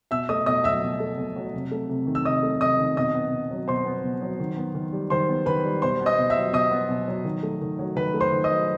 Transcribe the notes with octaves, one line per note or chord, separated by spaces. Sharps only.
B2 E5 E6
A3 D#5 D#6
B2 D#5 D#6
F#3 E5 E6
B2
A3
B2
F#3
C3
A3
C3
D#3
E6
C3 D#5 D#6
A3
C3 D#5 D#6
D#3
B2 D#5 D#6
B3
B2
F#3
B2 C5 C6
B3
B2
F#3
D#3
B3
D#3
G3
D#3 C5 C6
B3
D#3 B4 B5
G3
B2 C5 C6
B3
D#5 D#6
B2
E5 E6
F#3
B2 D#5 D#6
B3
B2
F#3
D#3
A3
D#3
F#3
D#3 B4 B5
A3
C5 C6
D#3
D#5 D#6
F#3